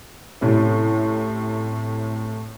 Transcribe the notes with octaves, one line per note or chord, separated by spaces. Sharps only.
A2 C3 C#4